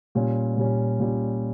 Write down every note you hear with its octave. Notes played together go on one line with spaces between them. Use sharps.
A#2 G3 C#4
A#2 G3 C#4
A#2 G3 C#4